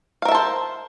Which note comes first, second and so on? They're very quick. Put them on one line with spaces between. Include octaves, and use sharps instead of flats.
F5 A#4 E5 A5 C5